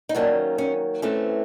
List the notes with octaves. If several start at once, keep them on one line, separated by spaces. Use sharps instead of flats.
D#4
D#3 F#3 A#3 C#4 D4
C#4
E3 A3 C4 C#4